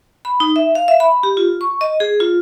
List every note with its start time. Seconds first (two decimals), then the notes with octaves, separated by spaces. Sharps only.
0.25 B5
0.40 D#4
0.56 E5
0.75 F5
0.88 E5
1.00 B5
1.23 G4
1.37 F4
1.61 C#6
1.81 D#5
2.00 G#4
2.20 F4